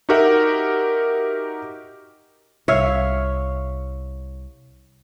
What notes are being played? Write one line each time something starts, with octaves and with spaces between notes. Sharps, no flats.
D#4 F#4 G4 A#4 E5 F#5
C2 C#5 E5 F5